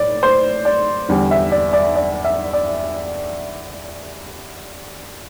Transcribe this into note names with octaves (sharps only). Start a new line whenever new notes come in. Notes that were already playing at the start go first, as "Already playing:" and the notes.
Already playing: A2 D5
C5
D5
E2 D3 G3
E5
D5
D5
D5
E5
D5